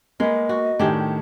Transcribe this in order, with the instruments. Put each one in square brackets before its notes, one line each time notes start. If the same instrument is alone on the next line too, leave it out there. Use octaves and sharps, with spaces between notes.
[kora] G#3 B3 [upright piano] A#3 [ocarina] D#5
[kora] F#4
[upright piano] A2 D#3 [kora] D4 G4 G#4